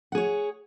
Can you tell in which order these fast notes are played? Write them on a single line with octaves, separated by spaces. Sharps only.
F#5 G#4 C#5